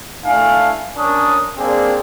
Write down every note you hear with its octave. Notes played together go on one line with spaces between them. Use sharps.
A3 D4 E4 F5 G#5
C#4 D4 A#4 C#5 D#6
A#3 C4 D4 G#4 D5